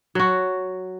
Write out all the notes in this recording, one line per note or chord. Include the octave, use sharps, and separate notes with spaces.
F#3 F#4